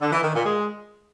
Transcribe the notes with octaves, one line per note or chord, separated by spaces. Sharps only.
D3
E3
D#3
A#2
G#3